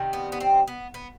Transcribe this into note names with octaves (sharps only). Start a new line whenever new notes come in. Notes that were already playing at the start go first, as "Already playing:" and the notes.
Already playing: C3 D#3 G3
B3
B3
C4
B3
B3